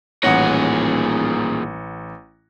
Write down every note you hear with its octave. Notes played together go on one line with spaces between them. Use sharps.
D#1 A1 A#2 G#4 C#5 F#5 A#6